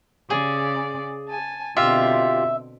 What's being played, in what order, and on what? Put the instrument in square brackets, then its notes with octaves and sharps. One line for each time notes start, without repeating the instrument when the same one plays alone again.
[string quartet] C#3 D5 [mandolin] G#4
[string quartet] G#5 A5
[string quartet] B2 D3 C4 [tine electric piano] F4 G4 F5 [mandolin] E5